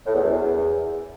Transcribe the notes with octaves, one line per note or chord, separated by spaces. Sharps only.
A2
E2
F#2
E2